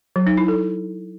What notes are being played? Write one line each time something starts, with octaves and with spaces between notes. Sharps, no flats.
F#3
D#4
E4
A4